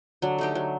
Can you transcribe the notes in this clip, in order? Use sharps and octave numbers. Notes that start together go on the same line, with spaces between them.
D3 F#3 D4
A3 D#4 G4
F#3